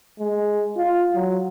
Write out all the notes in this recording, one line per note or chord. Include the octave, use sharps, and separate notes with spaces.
G#3
F4
F#3